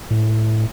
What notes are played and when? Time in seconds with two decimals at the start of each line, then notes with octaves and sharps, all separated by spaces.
0.11 A2